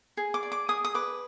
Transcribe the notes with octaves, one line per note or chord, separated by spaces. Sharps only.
G#4
D6
D5
D6
G#4 D#6
D#6
B4 D6